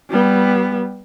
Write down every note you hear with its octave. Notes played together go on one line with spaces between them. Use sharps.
G3 B3